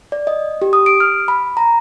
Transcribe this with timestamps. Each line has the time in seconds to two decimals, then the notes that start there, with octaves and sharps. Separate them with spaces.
0.12 D5
0.27 D#5
0.62 G4
0.73 D#6
0.86 D7
1.00 F6
1.28 B5
1.57 A#5